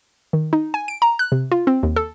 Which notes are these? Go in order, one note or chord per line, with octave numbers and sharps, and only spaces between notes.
D#3
D#4
G#5
D7
A#5
F#6
C3
F4
C4
D#2
A4